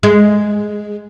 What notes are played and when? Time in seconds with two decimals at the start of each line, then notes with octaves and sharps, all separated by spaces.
0.03 G#3